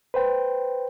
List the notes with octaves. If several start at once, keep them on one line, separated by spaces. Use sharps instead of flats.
B4 C5 G5